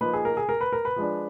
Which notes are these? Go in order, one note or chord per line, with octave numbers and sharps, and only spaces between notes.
F3 A#3 D#4 B4
G#4
A#4
G#4
A#4
B4
A#4
B4
F3 G#3 D4